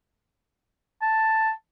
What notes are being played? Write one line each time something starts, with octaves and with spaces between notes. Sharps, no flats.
A5